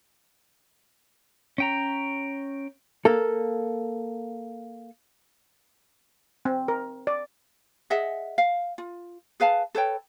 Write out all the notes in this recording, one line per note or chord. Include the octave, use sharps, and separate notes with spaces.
C#4 G5 A#5
A#3 A4
C4
A#4
D5
G#4 D#5 E5 F#5
F5
F4
G#4 B4 F5 A5
A4 B4 C#5 G5